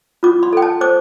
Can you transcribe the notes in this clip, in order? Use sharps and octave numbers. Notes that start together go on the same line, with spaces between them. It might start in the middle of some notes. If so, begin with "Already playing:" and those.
F4 D6
C6
A4 G5
A5
C5 D6